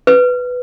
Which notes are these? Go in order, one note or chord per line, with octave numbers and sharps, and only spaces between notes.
B4